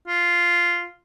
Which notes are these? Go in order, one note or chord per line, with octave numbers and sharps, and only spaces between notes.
F4